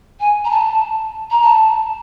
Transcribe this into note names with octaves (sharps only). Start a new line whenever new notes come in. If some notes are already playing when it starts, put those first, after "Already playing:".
G#5
A#5
A5
A#5
A5